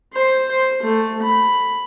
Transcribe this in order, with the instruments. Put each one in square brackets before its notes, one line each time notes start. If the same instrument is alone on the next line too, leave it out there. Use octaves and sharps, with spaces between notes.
[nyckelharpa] C5
C5
A3
B5